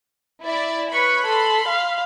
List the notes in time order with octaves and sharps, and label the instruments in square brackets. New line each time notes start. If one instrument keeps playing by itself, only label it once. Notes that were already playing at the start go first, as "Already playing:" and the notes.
[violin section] E4 D5
[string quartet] B4 C#5 C#6 [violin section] B5
[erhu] A4 [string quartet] C6
[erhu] F5